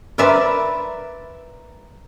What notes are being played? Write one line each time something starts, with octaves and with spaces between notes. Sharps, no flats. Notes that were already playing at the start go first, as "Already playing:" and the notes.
A#4 B4 D5 E5